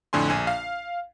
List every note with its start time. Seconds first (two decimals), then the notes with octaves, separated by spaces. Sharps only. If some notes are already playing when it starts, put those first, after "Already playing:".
0.13 F2 A2 D3 G#5 C6
0.30 A#1 G#5
0.47 F5